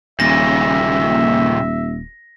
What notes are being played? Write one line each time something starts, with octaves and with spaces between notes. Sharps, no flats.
D#1 A#2 C#3 E5 A#6